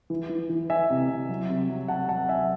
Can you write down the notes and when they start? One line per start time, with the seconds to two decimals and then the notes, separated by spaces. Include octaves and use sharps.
0.10 E3
0.29 E3
0.49 E3
0.70 E3 E5 G#5
0.90 C3
1.10 C3
1.29 F#3
1.49 C3
1.70 F#3
1.88 C3 F#5 A5
2.08 F#3 F#5 A5
2.29 F#3 E5 G#5